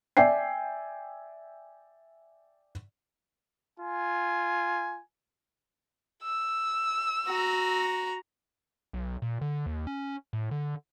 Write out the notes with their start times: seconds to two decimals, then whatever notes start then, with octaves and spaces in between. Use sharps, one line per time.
0.17 D5 E5 G5 G#5 C7
3.79 F4 G#5
6.23 E6
7.26 F#4 A#5
8.93 B1
9.22 A#2
9.41 D3
9.66 D#2
9.87 C#4
10.33 A2
10.51 D3